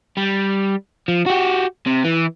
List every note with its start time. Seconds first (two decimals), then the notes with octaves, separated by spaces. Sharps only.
0.17 G3
1.08 F3
1.26 F#4 G4
1.87 C3
2.05 E3